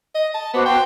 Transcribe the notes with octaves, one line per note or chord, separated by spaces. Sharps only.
D#5
A5
B3 F#4 C5 D6
G5 A5 C6